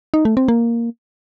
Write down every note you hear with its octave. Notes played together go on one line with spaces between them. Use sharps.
D#4
A3
C4
A#3